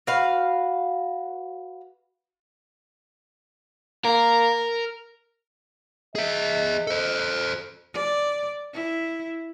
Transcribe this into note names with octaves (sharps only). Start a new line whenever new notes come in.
F#4 B4 F5
A#3 A#4
G#4 D#5 E5
A4 C5
D5
E4